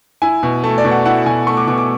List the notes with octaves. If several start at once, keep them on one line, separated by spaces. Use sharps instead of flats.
E4 G#5
B2
A3 A5
D5
B2
F#5
E4 F#5
B2 G#5
A3 C#6
D6
B2 D6
D6